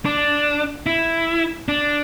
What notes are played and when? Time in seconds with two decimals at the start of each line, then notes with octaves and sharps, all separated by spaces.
0.05 D4
0.86 E4
1.68 D4